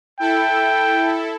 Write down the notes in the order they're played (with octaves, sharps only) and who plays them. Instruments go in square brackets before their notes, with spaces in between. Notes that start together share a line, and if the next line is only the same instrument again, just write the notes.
[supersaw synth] E4 A4 [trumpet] G5